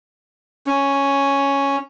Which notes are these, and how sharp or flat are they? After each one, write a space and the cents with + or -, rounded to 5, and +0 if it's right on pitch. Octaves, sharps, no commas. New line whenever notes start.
C#4 +0